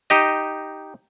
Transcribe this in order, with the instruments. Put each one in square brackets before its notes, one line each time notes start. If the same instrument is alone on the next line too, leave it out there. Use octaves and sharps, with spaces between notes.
[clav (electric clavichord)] D#4 G4 D#5